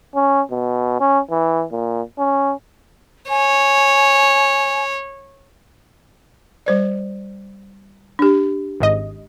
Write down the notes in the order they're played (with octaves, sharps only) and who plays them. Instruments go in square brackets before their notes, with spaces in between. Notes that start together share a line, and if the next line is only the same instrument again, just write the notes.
[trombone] C#4
B2
C#4
E3
A#2
C#4
[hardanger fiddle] C#5 [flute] G#5
[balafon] G3 C5 D5
D4 G4
[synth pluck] G#1 G#2 D#5